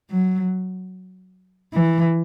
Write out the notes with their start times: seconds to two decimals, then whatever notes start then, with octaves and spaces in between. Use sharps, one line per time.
0.11 F#3
1.73 E3